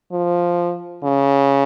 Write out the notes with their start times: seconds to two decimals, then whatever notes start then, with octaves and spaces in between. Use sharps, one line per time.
0.12 F3
1.04 C#3